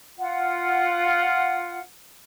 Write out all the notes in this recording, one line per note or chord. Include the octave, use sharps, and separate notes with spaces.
F4 F#5